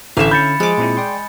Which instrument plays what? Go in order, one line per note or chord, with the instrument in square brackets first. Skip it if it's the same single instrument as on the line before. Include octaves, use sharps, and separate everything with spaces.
[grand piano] A1 A3 E7 [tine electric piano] D3 C#4 [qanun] E5 F5
[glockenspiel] B5 A6 C#7 [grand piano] G6
[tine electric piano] F3 [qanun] G#3 D6
[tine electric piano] A#2 C4 E4
D5 G5 C6